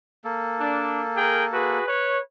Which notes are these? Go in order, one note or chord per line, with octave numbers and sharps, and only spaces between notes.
A#3 A4
D4
G#4 A#4 G5
F#4 G#4 B4
B4 C#5